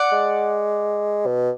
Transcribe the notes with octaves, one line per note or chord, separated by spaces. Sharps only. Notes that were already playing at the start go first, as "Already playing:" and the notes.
Already playing: D5 F#5
G#3
B2